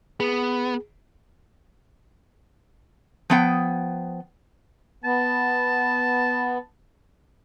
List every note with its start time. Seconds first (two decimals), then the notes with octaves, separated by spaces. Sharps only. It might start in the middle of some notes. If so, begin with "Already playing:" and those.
0.20 B3 G#4
3.30 F3 B3 G5
5.04 B3 A5